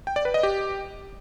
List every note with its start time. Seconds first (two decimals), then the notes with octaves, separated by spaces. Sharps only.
0.07 G5
0.16 D5
0.25 B4
0.34 D#5
0.43 G4